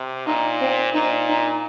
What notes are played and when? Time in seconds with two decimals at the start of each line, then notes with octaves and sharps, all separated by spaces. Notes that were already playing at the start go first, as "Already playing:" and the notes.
Already playing: C3
0.27 A#2 D#4
0.61 C4
0.94 A#2 D#4
1.28 D#4